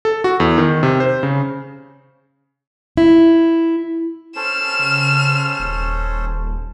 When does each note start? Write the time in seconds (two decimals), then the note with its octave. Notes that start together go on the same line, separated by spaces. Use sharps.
0.05 A4
0.24 F#4
0.40 E2
0.58 D#3
0.83 C3
1.00 C5
1.23 C#3
2.97 E4
4.36 C#4 A4 C5 F6 E7
4.79 C#3
5.59 D#1